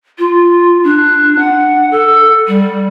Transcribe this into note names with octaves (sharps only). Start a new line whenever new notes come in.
F4
D4
F#5
A4
G3